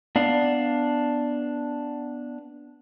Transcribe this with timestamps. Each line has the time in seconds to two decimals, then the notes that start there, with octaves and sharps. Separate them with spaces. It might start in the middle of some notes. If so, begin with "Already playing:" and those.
0.16 B3 D4 D5 F5